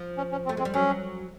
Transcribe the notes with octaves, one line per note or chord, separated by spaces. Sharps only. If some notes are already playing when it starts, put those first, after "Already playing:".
Already playing: F3
C#4
C#4
C4
A3
G#3 C4
G3
F#3 C#4